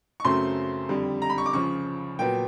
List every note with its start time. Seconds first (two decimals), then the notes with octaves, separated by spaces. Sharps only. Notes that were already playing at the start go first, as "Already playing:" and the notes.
0.20 C#6
0.25 F#2 C#3 F#3 A3 C4 C6
0.89 F2 D3 G3
1.22 A#5
1.30 B5
1.38 C#6
1.46 D6
1.53 C#2 C#3 F3 C#6
2.19 A#2 F#3 B3 G5